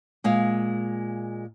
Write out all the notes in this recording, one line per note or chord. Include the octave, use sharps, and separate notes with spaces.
A#2 G#3 F5